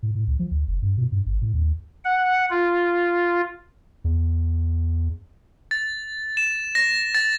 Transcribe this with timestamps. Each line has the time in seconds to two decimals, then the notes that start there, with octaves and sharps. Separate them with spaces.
0.03 A2
0.15 A2
0.27 C#2
0.39 F3
0.51 D2
0.67 F1
0.82 G2
0.97 B2
1.12 G2
1.26 G#1
1.42 A2
1.54 D#2
2.04 F#5
2.50 F4
4.04 E2
5.71 A6
6.37 E7
6.75 A#6
7.15 A6